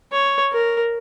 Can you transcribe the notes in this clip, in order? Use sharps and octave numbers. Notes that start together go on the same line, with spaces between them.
C#5
A#4